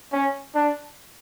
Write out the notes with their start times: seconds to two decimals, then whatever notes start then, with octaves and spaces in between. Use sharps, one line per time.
0.12 C#4
0.55 D4